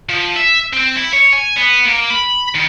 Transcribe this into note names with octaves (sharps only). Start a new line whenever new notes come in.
F3
E5
C4
E4
C#5
G#5
B3
A#3
B5
D#3